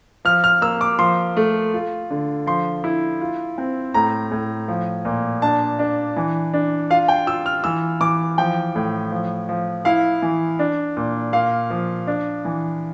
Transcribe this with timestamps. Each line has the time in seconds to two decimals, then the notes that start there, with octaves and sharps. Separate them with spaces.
0.25 F3 F6
0.44 F6
0.62 A#3 E6
0.81 D6
0.99 F3 C6
1.37 A3
1.74 F4
2.10 D3
2.47 F3 C6
2.84 E4
3.21 F4
3.58 C4
3.94 A2 A#5
4.31 A2
4.68 F3
5.05 A#2
5.42 D4 A5
5.79 D4
6.16 E3
6.54 D4
6.90 F4 F5
7.08 G5
7.27 F4 E6
7.46 F6
7.64 E3 E6
8.01 E3 D6
8.38 F3 G5
8.75 A2
9.12 F3
9.49 F3
9.85 E4 F5
10.22 E3
10.59 D4
10.97 A#2
11.33 A#2 F5
11.70 F3
12.07 D4
12.45 E3